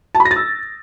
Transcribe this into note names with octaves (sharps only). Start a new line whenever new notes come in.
A5
B5
A#6
A6
E6